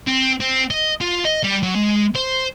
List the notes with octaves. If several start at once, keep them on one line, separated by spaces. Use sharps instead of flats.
C4
C4
D#5
F4
D#5
G3
F#3
G#3
C5